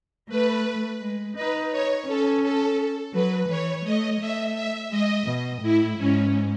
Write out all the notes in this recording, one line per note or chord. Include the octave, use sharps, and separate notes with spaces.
A3 B4
G#3
D#4 B4
C#5
C#4 A4
A4
F#3 B4
E3 C#5
A3 D#5
A3 E5
E5
G#3 D#5
B2
A2 E4
G#2 C#4